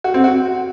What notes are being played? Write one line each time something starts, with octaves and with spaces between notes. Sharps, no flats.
F#4
C4
F#4